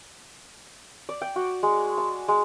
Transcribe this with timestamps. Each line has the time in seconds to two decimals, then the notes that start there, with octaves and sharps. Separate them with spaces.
1.09 D5
1.22 G5
1.36 F#4
1.63 G#3
1.98 A5
2.28 G#3